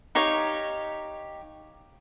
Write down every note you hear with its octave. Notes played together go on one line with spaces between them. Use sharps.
D#4 G4 C#5 F5